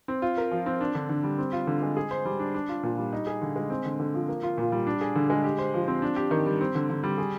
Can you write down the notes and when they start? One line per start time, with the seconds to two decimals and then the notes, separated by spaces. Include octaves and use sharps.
0.08 C4
0.22 F4
0.38 A#4
0.51 F3
0.66 C4
0.81 D4
0.95 D3
1.09 D3
1.23 G3
1.39 C4
1.53 F4
1.67 D3
1.82 G#3
1.97 G#4
2.11 C5
2.25 G3
2.39 D4
2.54 D4
2.69 F4
2.83 A#2
2.98 G3
3.13 D#4
3.27 G#4
3.42 D3
3.56 G#3
3.70 C4
3.85 D3
4.00 D3
4.14 F3
4.28 A#3
4.43 F4
4.58 A#2
4.72 G3
4.87 D4
5.01 G#4
5.15 D3
5.30 G#3
5.44 G4
5.59 C5
5.74 F3
5.88 C4
6.02 D4
6.16 G4
6.31 D#3
6.46 G3
6.61 C4
6.75 D3
6.90 D3
7.04 G3
7.18 G#4